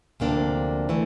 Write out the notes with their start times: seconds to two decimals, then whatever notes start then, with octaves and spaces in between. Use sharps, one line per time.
0.20 D2 C3 F3 A#3 D4
0.89 E3 A3